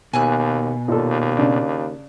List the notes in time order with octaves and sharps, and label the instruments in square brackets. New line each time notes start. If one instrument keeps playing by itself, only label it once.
[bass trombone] D#2 [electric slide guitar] B2 [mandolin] G#5 E6 F#6
[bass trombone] D#2 [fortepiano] A#2 A4
[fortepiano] C#3 D4 D5